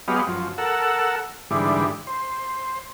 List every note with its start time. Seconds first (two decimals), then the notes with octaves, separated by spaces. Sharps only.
0.08 F#3 G#3 B3 G4 D#5 F5
0.27 F#2 F3
0.58 A4 A#4 F#5 E6
1.51 G#2 D3 E3 G3
2.07 C5